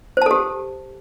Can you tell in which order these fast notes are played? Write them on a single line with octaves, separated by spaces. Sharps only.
C5 A5 A4 G4